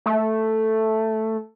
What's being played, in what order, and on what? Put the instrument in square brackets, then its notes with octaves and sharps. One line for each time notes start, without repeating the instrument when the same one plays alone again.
[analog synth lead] A3